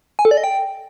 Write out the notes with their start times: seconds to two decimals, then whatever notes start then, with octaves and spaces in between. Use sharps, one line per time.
0.19 G#5
0.25 A4
0.31 D5
0.37 D#5
0.44 G5